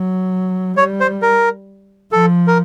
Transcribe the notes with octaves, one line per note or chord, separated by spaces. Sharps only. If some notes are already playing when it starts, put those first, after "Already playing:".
Already playing: F#3
G3 C#5
C5
A#4
F3 A4
A#4